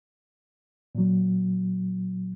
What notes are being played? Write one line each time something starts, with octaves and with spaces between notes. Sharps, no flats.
A#2 F#3